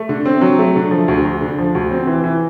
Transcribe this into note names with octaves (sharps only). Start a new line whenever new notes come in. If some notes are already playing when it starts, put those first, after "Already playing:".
Already playing: A3
D3
C4
F#3
A3
D3
F3
D2
D2
D3
F3
D2
C4
E3
E3